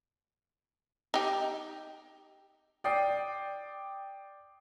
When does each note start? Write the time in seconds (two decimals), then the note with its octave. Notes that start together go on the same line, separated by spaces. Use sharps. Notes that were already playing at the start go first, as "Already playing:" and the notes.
1.14 D#4 G4
2.84 D5 G5 D#6 C7